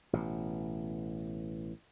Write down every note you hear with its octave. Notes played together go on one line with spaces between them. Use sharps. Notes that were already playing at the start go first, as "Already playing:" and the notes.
A1 B2